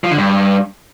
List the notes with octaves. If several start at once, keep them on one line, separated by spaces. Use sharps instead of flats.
F3
D3
G2